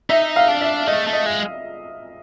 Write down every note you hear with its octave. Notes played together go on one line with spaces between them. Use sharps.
D#4 E5
F5
D4
E5
A3 D#5
A3
D#5
G#3